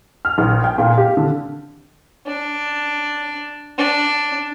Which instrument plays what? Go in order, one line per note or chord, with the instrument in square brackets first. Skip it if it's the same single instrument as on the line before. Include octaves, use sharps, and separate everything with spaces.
[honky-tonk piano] F6
A#1
G5
A#2
G4
D3
[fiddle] D4
D4